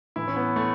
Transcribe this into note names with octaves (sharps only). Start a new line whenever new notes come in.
A2 E3 E4
C#4
B3
A3